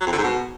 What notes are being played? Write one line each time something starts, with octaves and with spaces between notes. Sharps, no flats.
F#3
F2
D3
G#2
B2